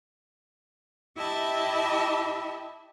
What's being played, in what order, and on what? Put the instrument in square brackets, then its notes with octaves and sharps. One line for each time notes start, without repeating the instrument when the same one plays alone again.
[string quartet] E4 G4 D#5 E5 A5 B5